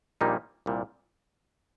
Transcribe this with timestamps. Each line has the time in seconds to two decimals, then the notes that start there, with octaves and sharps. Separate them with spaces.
0.21 A#1 A#2 G3 A#3 D#4
0.66 C2 A#2 G3